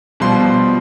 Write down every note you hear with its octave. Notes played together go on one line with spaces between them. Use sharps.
B2 F3 G3 C6